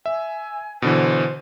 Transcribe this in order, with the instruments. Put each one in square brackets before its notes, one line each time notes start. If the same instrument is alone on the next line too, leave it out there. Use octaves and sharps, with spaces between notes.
[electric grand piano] E5 [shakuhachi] G#5
[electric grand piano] B2 D3 E3 [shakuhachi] C5